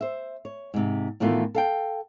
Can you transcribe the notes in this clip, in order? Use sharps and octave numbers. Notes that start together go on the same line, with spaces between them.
C5 E5
C#5
G#2 C3
A2 D#3 E3 A3 B3 F4
A4 F5 G5